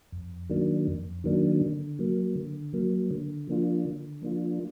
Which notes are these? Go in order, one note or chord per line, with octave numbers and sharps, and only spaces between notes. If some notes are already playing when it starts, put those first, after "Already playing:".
F2
D#3 F#3 A#3 D4
F2
D#3 F#3 A#3 D4
D3
F#3 A#3
D3
F#3 A#3
D3
F3 A#3 D4 F4
D3
F3 A#3 D4 F4